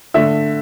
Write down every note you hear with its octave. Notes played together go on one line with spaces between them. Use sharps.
D3 A3 E5